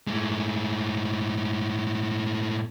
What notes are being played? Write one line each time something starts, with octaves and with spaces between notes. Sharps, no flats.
A2 G#3